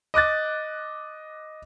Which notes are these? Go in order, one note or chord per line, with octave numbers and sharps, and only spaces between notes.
D#5 D6 F#6 A6